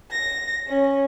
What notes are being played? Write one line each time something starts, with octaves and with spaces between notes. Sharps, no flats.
A#6
C#4